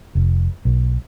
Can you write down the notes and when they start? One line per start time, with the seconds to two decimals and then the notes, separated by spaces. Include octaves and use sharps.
0.15 F1
0.65 B1